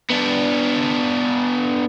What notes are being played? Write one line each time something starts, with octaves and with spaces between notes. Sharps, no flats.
B3 D4